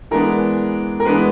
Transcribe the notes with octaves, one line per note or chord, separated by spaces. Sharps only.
E3 G#3 B3 D4 A#4
A#4
E3 G#3 B3 D4 B4